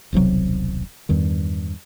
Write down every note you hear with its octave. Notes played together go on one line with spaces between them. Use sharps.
D#1 B1 C3 F#3
E2 G2 D#3